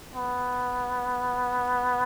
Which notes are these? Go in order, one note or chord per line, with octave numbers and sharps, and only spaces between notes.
B3